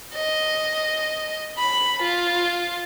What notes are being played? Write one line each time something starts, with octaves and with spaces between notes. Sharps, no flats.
D#5
B5
F4